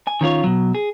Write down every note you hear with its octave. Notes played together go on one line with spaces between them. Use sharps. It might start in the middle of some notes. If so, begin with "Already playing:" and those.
G#5
D#3 C#4 F4 C#5
B2 F#3
G#4